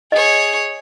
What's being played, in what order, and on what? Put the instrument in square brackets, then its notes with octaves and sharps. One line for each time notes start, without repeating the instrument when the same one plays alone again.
[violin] G#4 C#5 [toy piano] D#5